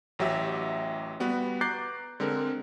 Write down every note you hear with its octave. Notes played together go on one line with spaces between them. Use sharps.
A1 F#3 G4 E5 E6
G3 B3 F#4 B4
A#5 D6 F#6 G6 A6 C7
D3 G#3 C4 A#4